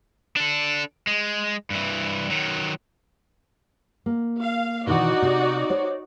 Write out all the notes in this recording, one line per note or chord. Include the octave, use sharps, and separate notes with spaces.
D4 A4
G#3
G2 E3
D#3 F#3
A#3
F5
B2 D#3 E3 D#4 F#4 D5
C3
C5 C#5